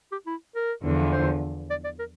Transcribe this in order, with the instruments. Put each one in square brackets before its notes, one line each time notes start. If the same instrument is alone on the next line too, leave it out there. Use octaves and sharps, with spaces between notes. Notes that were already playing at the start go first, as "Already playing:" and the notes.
[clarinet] G4
E4
A#4
[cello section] E2 D3 F3
[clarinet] C5
D5
D5
A#4